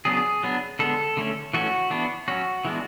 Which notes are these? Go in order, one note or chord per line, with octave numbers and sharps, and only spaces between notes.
C#3 F#3 B3 D4 G#4
F#3 B3 D4
D3 G#3 B3 A4
D3 A3 C#4
E3 A3 C#4 F#4
E3 B3 D4
F#3 C#4 F#4
E3 G#3 B3 D4